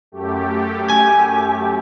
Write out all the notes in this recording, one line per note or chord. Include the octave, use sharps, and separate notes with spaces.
F#2 A3 G4
G#5